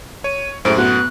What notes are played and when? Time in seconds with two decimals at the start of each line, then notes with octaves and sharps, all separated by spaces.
0.24 C#5 D#7
0.65 F#2 A2 G#3 E4 C5 D7
0.78 B3 F#4 F#6